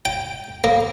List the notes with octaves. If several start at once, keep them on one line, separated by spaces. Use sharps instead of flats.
G5
A#3